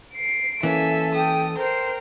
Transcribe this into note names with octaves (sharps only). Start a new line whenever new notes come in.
C7 D7
E3 A#3 C#4 A4 E5 G#5
G5 D#6
A#4 C5 G5